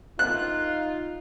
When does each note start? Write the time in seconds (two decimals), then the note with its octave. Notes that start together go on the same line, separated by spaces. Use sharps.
0.19 D#4 F4 F#6